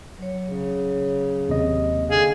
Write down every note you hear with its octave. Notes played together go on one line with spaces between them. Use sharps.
F#3 C#5
C#3
D#2 C3 D#5
D3 D4 G#4 F5